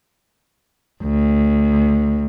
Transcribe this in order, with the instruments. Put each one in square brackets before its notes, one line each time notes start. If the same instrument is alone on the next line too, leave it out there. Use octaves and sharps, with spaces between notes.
[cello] D2